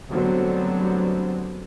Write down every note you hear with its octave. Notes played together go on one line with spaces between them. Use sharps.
D3 F#3 G3 A3 B3 C4